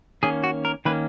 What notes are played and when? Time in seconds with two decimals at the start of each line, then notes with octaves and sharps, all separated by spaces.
0.23 D#3 A#3 C#4 G#4
0.44 F#4
0.65 A#4
0.85 D#3 A#3 C#4 B4